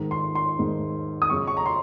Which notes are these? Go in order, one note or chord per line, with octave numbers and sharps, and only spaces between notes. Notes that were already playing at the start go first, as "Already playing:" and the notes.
Already playing: G#2 D#3
C6
C6
G#2 D#3
D#6
F#2 C#3 C#6
C#6
A#5
C6